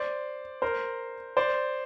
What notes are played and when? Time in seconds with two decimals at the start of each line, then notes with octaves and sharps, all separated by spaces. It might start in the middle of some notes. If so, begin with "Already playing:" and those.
Already playing: C5 D5
0.62 A#4 C5
1.37 C5 D5